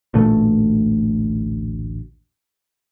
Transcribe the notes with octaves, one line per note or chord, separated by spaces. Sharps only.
A1 D2 A#2 A3